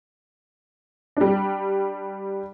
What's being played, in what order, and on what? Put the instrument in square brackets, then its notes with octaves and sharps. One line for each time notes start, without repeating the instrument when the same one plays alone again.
[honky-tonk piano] G3 D4